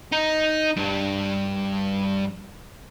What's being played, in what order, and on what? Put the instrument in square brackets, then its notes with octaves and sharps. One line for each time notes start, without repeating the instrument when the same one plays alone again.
[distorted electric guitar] D#4
G2